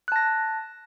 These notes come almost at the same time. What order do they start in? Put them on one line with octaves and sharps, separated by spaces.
F#6 A5 A#6